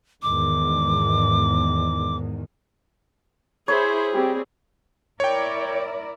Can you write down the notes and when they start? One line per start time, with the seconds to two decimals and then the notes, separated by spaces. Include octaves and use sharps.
0.22 E2 G#2 D#3 D6
3.68 E4 G#4 C5 C#5 B5
4.13 G3 C4 G4
5.20 E4 A#4 C#5 D5 G5